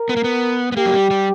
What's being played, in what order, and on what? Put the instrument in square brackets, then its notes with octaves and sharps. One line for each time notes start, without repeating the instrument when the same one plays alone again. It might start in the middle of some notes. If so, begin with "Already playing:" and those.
Already playing: [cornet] A#4
[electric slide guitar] B3
A#3
B3
B3
[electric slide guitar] A#3 [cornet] G4
[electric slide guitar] F#3
G3
G3